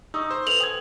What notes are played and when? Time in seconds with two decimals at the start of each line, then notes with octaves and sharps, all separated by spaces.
0.14 D#4 C#6 D#6 E6
0.31 C5
0.47 A4 B4 F7 F#7
0.61 G5 D#6 G#6